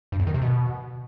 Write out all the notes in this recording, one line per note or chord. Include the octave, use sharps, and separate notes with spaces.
G2
E2
D#3
C3
B2